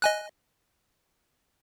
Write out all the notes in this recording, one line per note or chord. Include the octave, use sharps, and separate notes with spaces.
D#5 G#5 F#6